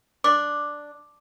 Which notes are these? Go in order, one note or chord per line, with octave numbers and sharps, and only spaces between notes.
D4 D6